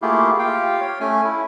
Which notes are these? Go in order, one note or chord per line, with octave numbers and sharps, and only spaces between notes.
A3 A#3 E4 F4 G4 G#4
F4 G4 F5 G5
C#5
A3 C#4 G#5
E4